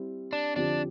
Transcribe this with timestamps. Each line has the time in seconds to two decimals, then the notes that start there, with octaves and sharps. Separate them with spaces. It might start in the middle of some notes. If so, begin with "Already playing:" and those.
Already playing: G3 C4 E4
0.33 D4
0.56 F2 D3 F3 C4 D4 G4